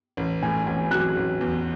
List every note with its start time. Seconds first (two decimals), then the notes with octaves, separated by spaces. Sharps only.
0.17 A1
0.42 A2 G#5
0.66 A1 G#5
0.91 F#3 F#6
1.17 A1
1.41 E2